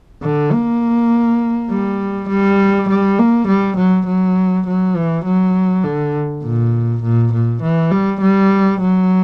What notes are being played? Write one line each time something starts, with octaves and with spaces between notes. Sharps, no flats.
D3
A#3
G3
G3
G3
A#3
G3
F#3
F#3
F#3
E3
F#3
D3
A#2
A#2
A#2
E3
G3
G3
F#3